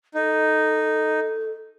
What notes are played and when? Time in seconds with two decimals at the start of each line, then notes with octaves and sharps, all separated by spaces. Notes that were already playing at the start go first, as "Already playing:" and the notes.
0.15 D#4 A4